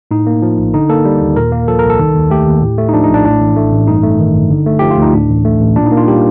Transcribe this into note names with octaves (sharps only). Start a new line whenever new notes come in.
A2 D#4
A#3
F3
A#1
D3 D#4
A#3 A4
G3
D#2
A#2 A#4
A#3
F3 A4
C2 A#4
A4
D#3
D#2
A3 G4
D#2
A2
A3
D#4
F3 D4
D#4
A#1 D4
A2 D4
A1
A3
A1
G2 D#4
A3
D#3
G1
D3
A3
F3 G4
F4
D2 D#4
A2 D4
A1
A3
A1
A#2 D4
D#4
A#3
F4
G3 G4